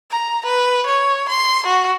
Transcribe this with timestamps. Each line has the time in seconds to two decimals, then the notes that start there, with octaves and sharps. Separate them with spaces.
0.11 A#5
0.46 B4
0.86 C#5
1.29 C6
1.66 F#4